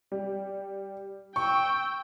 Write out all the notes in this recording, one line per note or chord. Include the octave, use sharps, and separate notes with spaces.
G3
G5 C#6 E6